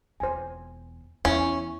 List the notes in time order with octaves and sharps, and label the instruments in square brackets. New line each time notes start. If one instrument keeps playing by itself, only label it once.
[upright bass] E1 E2 [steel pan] C5 G#5
[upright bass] E2 [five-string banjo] C#4 [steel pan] E4